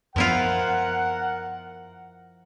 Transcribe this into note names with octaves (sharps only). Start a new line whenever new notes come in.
F#2 F3 B3 E4 F4 A#4 F#5